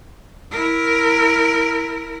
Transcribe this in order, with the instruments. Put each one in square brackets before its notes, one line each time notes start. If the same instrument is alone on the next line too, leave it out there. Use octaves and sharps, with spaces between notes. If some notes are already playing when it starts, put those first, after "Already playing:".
[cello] E4 A#4